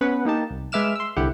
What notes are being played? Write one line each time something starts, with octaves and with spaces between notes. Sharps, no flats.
B3 C#4 B4 F#5
A#3 D#4 G4 A5
C2
G#3 B4 E5 D6 F6 E7
C6 E6
C2 D3 E4 G4 F#5